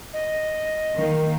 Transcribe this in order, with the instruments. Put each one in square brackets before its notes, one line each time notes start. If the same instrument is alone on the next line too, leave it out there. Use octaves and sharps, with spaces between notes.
[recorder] D#5
[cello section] D#3 A#3